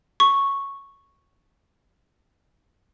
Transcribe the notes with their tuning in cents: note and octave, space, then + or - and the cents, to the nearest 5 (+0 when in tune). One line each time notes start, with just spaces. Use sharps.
C#6 -5